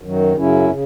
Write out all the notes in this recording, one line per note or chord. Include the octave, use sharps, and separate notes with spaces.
F#2 D#3 F#3
F#2 C#3 F#3 C#4 E4
C#3